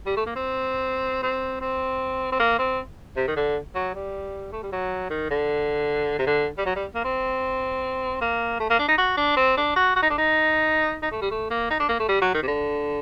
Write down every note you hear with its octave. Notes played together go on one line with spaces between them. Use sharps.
G3
A3
A#3
C4
C4
C4
C4
A#3
C4
C3
D#3
D3
F#3
G3
A3
G3
F#3
D#3
D3
C3
D3
G3
F#3
G3
A#3
C4
A#3
A3
A#3
D4
D#4
F#4
D4
C4
D4
F#4
F#4
D#4
D4
D#4
D#4
A3
G3
A3
A#3
D#4
D4
A#3
A3
G3
F#3
D#3
C3
D3